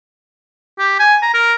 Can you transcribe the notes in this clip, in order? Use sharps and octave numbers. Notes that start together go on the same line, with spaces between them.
G4
G#5
A#5
A#4